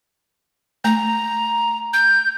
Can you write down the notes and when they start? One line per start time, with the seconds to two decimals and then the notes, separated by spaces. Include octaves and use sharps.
0.84 A3 A#5
1.93 G6